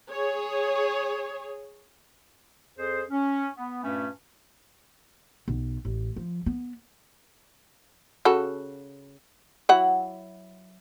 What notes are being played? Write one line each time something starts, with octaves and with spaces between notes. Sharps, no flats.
G#4 C#5
F2 G#4 C5
C#4
B3
G2 A#2 A3 C#4
B1
A1
F3
B3
C#3 F#4 A4
F#3 E4 F#5